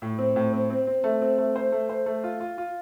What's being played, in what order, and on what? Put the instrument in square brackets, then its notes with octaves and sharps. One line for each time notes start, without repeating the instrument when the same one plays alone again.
[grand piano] A2
C4
A2
C4
C4
C4
A3
C4
A3
C5
A3
C5
A3
F4
F4
F4